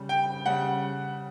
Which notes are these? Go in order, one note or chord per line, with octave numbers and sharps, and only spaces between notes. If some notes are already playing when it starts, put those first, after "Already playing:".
Already playing: C#3 G3
G5
C#3 G3 F#5